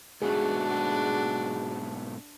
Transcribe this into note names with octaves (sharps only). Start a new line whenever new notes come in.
G#2 B2 A3 D4 F#4 G#4